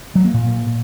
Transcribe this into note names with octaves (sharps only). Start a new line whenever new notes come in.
F#3
A#3
A#2